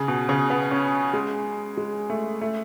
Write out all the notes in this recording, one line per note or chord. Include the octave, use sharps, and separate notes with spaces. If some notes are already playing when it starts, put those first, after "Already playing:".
Already playing: C#3
B2
C#3
B3
C#4
G#3
G#3
A3
A3